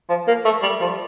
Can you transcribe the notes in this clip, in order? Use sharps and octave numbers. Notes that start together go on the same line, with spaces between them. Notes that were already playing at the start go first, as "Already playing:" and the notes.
F3
A#3
A3
G3
F3